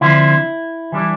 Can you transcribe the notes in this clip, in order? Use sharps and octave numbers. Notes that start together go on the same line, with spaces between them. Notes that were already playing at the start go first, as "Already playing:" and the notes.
D3 F3 C4 E4
E3 G3 D4